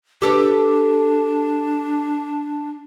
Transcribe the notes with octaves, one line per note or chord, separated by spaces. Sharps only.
D4 G4 A4 B4